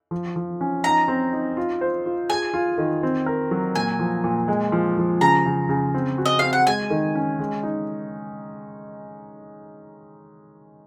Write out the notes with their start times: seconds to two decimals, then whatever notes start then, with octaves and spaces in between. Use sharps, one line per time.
0.11 F3
0.36 F3
0.61 C#4
0.84 D#4 A#5
1.08 C4
1.33 D#4
1.57 F4
1.81 C5
2.06 F4
2.30 G#4 G#5
2.54 F4
2.78 D#3
3.03 C4
3.26 A#4
3.51 F#3
3.75 A#2 G#5
3.99 F3
4.24 A#2
4.48 G#3
4.72 F3
4.97 F3
5.21 C#3 A#5
5.46 C#3
5.69 C#3
5.94 C4
6.18 F#4
6.26 D#5
6.39 C4 F5
6.53 F#5
6.67 G#3 G#5
6.90 D#3
7.15 C#4
7.39 G#3
7.63 D#4